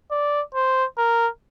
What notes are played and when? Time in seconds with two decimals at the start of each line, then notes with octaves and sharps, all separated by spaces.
0.11 D5
0.54 C5
0.97 A#4